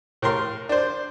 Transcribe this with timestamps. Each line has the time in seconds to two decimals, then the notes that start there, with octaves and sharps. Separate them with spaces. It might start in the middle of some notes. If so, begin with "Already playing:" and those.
0.22 A2 A#4 C6
0.69 D4 C5